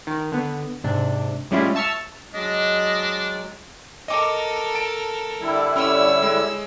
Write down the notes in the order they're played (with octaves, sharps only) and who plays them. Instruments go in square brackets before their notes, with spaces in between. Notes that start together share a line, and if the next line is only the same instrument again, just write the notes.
[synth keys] D#3
D3 B3
G#2 C3 D4
A2 G3 G#3 C#4 E4 F4
E5 A5 C#6 E6 F6
[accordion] F#3 G#3 [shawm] D4 [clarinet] D#5
[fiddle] A4 A#4 [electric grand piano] D#5 D6
[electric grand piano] A5 D7
[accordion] D3 G3 E4
[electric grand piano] C#4 [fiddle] C#5 E6
[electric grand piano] G#3